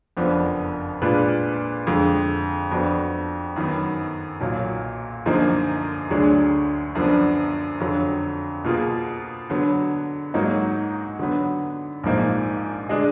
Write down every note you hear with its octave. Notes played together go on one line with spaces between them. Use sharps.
F#1 F2 F3 B3 D4
A#2 G#3 D4 F4 B4
F2 D3 G#3
F2 F3 B3 D4 F#4
F#2 D#3 F#3 B3
B1 A#2 F#3
F#2 D3 F3 A#3 D#4
D2 D3 F#3 D4 G#4
F#2 D3 F3 B3 D4
F2 D3 F#3
B2 A#3 F4 G#4
D3 F#3 B3
G#2 F#3 A#3 D#4 F#4
D3 F#3 B3
A#1 G#2 F3 A#3 D#4
D3 G#3 D4 G#4 D#5